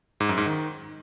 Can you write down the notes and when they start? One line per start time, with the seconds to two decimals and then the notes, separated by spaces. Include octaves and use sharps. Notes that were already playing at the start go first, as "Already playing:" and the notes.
0.20 G#2
0.29 F#2
0.38 G#2
0.46 D#3